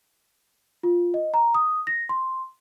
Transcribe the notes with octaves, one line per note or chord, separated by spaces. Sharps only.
F4
D#5
A#5
D#6
A#6
C6